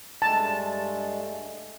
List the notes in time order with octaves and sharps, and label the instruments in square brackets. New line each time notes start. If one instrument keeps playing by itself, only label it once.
[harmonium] G2 G#3 A3 [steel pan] A5